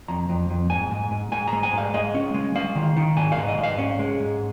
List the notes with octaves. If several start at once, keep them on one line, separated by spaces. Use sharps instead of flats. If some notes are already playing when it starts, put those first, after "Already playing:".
F2 A#5
F2
F2
G#2 G#5
G#2
G#2
G#2 G#5
A#5
G#3
G#5
G#2 F5
G#3 D#5
C#4
G#3
G#3 F5
D#3
D#3
G#2 G#5
F5
G#2
D#5
G#2
F5
C#4
G#3
G#2